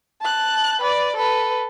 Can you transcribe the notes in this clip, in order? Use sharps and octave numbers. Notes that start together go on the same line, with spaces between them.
A5 F#6
B4 D5
A4 B4